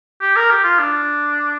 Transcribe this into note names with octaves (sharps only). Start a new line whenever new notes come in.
G4
A#4
G4
F4
D4